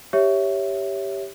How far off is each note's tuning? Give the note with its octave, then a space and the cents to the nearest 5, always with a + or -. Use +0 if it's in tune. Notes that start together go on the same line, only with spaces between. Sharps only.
G4 +0 C#5 +0 E5 +0